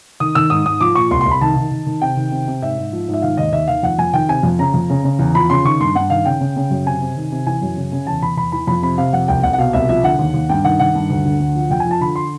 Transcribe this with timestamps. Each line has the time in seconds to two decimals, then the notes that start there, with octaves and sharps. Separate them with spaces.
0.20 D#3 D#6
0.35 D#3 E6
0.50 G#2 D#6
0.65 G#2 D#6
0.81 F3 D6
0.95 A#2 C#6
1.11 C2 C6
1.21 C2 C6
1.31 B5
1.41 D#3 A5
1.56 D#3
1.71 D#3
1.87 D#3
2.02 C3 G5
2.17 D#3
2.32 C3
2.47 C3
2.62 G#2 E5
2.77 G#2
2.92 F3
3.08 G#2
3.13 E5
3.22 D#3 F5
3.37 D#2 D#5
3.52 D#2 E5
3.68 D#3 F5
3.83 F2 F#5
3.99 F2 G#5
4.13 D#3 G5
4.28 C3 G#5
4.43 F2
4.59 C#3 A#5
4.74 F2
4.90 C#3
5.04 C#3
5.19 E2
5.34 F3 B5
5.50 C#3 C6
5.65 D#3 C#6
5.80 G2 C6
5.95 G2 F#5
6.10 D#3 F5
6.25 C#3 G5
6.40 C#3
6.56 C#3
6.71 F#2
6.86 C3 G#5
7.02 C3
7.17 D#3
7.32 C3
7.47 E3 G#5
7.62 F#2
7.77 C#3
7.92 C#3
8.07 E2 A5
8.22 E2 B5
8.37 E2 B5
8.52 E3 B5
8.67 F2 B5
8.82 C3 B5
8.98 C3 F5
9.13 F2 F#5
9.28 C2 G5
9.43 C2 F#5
9.53 F#5
9.58 B2 F5
9.73 C2 E5
9.89 F3 E5
10.04 D3 F#5
10.19 D#2
10.34 D#2
10.49 G2 G5
10.64 D#3 F#5
10.79 D#3 F#5
10.95 G2
11.10 D2
11.25 D3
11.40 D2
11.55 F3
11.70 F2 G5
11.80 G#5
11.86 F3
11.91 A5
12.01 D3 B5
12.16 C6